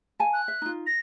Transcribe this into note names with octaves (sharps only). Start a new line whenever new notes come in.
F5 G#5 A5
F#6
E5
D#4 F4
A#6